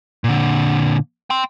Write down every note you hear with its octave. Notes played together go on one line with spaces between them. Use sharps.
A#2 D3
G5 C6